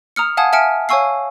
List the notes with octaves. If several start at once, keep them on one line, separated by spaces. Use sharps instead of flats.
A#5 D#6 F6 C#7
F5 F#5 G#5 A5 D#6 G#6
E5 G#5 A5 F6 C#7 D7
C#5 F5 G#5 C#6 E6 C7